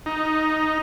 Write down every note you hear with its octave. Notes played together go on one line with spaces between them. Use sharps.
D#4